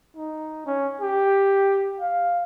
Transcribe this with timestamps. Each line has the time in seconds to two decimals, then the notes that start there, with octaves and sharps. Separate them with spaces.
0.17 D#4
0.66 C#4
1.01 G4
2.00 F5